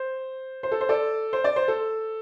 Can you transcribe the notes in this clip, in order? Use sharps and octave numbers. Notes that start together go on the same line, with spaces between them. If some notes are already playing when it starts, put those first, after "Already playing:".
Already playing: C5
C5
A4
C5
A4 D5
C5
D5
C5
A4